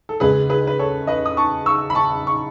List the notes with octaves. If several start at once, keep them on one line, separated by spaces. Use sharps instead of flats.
A4
C#2 C#3 G#3 G#4 B4
G#4 B4
B4
A4 C#5
B4 D#5
D#6
A5 C#6
C#6 E6
B5
A5 C#6
C#6